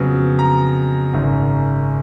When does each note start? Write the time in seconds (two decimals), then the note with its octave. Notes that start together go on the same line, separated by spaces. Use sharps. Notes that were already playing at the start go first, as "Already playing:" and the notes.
Already playing: F2 C#3 F#3 B3
0.39 A#5
1.13 G#1 F#2 C#3